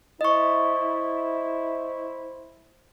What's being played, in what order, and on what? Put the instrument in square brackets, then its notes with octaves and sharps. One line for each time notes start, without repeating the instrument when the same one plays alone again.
[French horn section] E4 C5 [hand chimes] D#5 C#6